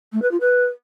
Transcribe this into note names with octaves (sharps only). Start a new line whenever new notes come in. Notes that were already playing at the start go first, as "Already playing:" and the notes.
A3
B4
F4
B4